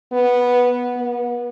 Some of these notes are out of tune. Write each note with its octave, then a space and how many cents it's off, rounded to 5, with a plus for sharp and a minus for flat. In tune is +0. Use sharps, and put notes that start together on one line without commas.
B3 -5
B3 -35